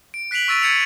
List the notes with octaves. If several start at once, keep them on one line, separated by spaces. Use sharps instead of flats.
D7
F#6 B6 C7 D7 F7 F#7
C#6 E6 A6 D7 D#7 F#7
G#6 A6 C#7 D#7 F7